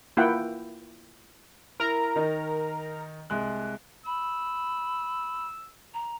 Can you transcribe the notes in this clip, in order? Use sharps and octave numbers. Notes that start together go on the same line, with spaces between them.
A#3 E4 F4 F#5 G5
E4 A#4 A#5
D#3 D#4
C2 G#3 F#6
B5 E6
A#5